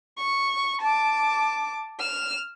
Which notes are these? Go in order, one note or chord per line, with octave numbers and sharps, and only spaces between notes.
C#6
A5 D6
F6 E7